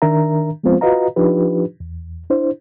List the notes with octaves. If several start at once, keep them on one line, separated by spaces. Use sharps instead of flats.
D#3 D4 A#4 E5 A#5
F3 G#3 B3 C4 F4 C5
F4 F#4 B4 D#5 F5 A#5
F3 D4 D#4 F4 G4 B4
E2
D4 E4 C5